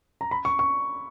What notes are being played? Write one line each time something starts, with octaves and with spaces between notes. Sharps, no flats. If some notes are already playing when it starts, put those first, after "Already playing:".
A#5
B5
C#6
C#6